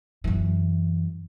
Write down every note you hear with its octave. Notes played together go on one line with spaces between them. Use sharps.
F#2 E3